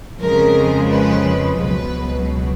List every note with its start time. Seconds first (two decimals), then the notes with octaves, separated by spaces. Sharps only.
0.21 F2 C#3 F3 G#3 A#4
0.90 B4
1.59 C#2 B2 F#3 B4